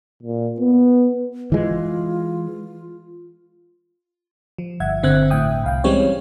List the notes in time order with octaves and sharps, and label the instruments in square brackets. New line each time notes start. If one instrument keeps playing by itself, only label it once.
[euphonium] A#2
B3
[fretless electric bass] E3 G#3 [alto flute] F4
[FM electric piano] F3
G1 G2 E5 F#5 G#6
G1 D3 C4 E5 F#6 G#6
A2 E5 G5 D#6
C2 F5 G5
E3 G3 G#3 C4 C#4 C#5